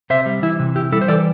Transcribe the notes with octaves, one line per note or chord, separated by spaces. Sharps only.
C3 C5 E5
G3
E3 E4
C3
E4 G4
G3 E4 A4
C5
E3 A4 D5